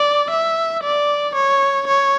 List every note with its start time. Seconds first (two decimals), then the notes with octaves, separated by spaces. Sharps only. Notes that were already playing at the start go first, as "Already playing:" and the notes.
Already playing: D5
0.30 E5
0.83 D5
1.35 C#5
1.87 C#5